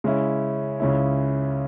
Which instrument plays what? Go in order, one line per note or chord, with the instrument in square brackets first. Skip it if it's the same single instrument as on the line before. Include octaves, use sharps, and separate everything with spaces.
[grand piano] C#3 G#3 C#4 E4
C#2 C#3 G#3 C#4 E4